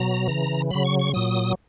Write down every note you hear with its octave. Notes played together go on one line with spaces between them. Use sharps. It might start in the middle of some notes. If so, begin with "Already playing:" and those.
Already playing: B2 F#3 A#5
C#3 E3
C#3 F#3 B5
C#6
C#6
A#2 F#3 D#6